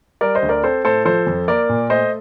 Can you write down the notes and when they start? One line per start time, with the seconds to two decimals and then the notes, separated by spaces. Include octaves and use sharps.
0.21 G3 A#4 D5
0.35 C5 D#5
0.42 D2
0.49 A#4 D5
0.63 C4 A4 C5
0.85 A2 A4 C5
1.05 F3 A4 C5
1.27 F2
1.48 A#3 A#4 D5
1.69 A#2
1.90 A3 C5 D#5